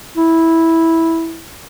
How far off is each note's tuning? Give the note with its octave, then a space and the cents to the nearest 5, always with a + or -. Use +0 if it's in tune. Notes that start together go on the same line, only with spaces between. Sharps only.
E4 -10